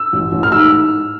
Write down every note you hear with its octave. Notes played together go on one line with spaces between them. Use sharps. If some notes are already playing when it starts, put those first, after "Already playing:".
Already playing: E6
A1
A1
F6
G#2 E6